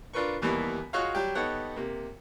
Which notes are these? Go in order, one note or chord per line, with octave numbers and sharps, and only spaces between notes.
D4 F4 A#4 B4 C#6
D#2 E3 G3 A#3 B3
F4 F#4 G#4 C#5 D#5 F5
F#3 G3 G4
B3 D#4 G4 A4 C#5 F#5
C3 A#3